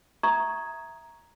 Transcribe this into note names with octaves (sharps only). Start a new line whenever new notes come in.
E5 A#5 C#6 D#6 G#6